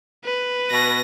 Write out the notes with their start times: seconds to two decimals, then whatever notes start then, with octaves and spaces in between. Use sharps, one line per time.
0.25 B4
0.71 B2 A#6